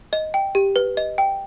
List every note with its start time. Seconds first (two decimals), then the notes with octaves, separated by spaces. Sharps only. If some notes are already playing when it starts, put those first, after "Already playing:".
0.13 D#5
0.34 G5
0.55 G4
0.76 B4
0.97 D#5
1.18 G5